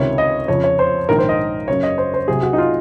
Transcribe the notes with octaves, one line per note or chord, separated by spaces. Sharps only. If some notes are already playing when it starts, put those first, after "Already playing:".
Already playing: C#2 C3 D#3 C#5
D#5
F2 C#3 F3 C#5
C#5
C5
A#1 G#2 D#3 A#4
C5
D#5
F#1 F#2 C#3 C#5
D#5
C5
C5
C2 C3 F#3 G#4
F#4
D#4
F4